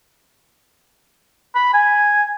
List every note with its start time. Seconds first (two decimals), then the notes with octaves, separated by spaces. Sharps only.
1.55 B5
1.74 G#5